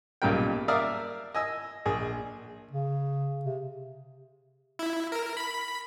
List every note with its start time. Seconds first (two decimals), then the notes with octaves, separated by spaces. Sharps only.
0.22 B1 A#2 C#3 G3 A#4 G5
0.68 A#4 D5 E5 F5 D#6 F6
1.35 D#5 G#5 E6
1.85 A#1 G#4
2.71 C#3
3.45 C3
4.79 E4
5.12 A#4
5.37 B5